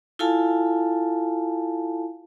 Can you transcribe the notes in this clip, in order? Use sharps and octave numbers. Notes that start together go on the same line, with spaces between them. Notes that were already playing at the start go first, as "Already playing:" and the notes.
E4 F4 A4 F5 G#5 A5